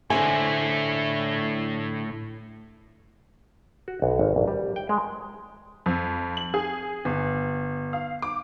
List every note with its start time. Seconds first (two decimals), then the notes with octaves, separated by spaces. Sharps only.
0.10 A2 D3 E4 C5 G#5
3.88 F#4
4.02 B1
4.19 G#1
4.36 A#1
4.48 G3
4.76 G5
4.89 G#3
5.86 F2
6.37 F#7
6.54 G#4
7.05 G1
7.93 F5
8.22 D6